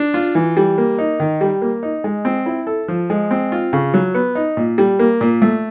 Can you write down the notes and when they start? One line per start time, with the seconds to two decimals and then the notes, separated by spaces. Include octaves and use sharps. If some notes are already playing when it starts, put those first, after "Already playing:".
Already playing: D4
0.14 F4
0.35 E3
0.57 G3
0.78 A#3
0.98 D#4
1.20 D#3
1.41 G3
1.62 A#3
1.83 D#4
2.04 G#3
2.25 C4
2.46 E4
2.67 A4
2.88 F3
3.10 G#3
3.31 C4
3.52 F4
3.73 C#3
3.94 F#3
4.15 B3
4.35 D#4
4.57 A#2
4.78 G3
4.99 A#3
5.21 A#2
5.42 A3